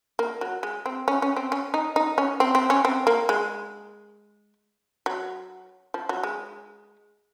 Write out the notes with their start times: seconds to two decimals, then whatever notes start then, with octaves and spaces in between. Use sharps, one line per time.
0.19 A#3
0.41 F#3
0.63 G#3
0.86 C4
1.08 C#4
1.22 C#4
1.36 C4
1.52 C#4
1.74 D#4
1.96 D#4
2.18 C#4
2.40 C4
2.55 C4
2.70 C#4
2.85 C4
3.07 A#3
3.29 G#3
5.06 F#3
5.94 F3
6.09 F#3
6.23 G#3